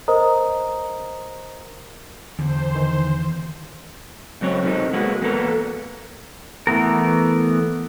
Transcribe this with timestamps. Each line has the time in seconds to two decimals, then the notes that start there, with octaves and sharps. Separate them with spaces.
0.08 A#4 C5 D#5 A#5 D#6
2.39 E2 D3 C5
2.75 D#3 E3
4.41 C#2 F#3 C4 C#5
4.63 C3 D#3 B3 C4 D#4
4.93 G#3 A#3 B3 F#4
5.21 E2 A#3 B3 C#4 A4 A#4
6.67 E3 A3 B3 A#4